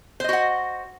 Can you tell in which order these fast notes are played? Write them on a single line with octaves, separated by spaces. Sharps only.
C5 D#5 F#4 F#5